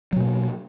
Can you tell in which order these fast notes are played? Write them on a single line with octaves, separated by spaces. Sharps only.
F#3 B2 A#3